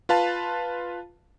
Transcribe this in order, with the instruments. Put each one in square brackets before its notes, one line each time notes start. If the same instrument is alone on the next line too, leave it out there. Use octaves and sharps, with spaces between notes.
[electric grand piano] F4 B4 F5 A5